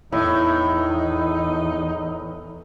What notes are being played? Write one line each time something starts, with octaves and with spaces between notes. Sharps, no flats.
E2 A2 D#4 E4